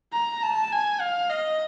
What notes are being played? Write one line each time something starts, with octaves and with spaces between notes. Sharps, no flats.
A#5
A5
G#5
F5
D#5